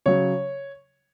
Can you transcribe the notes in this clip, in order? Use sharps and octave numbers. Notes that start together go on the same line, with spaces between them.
C#3 F#3 C#5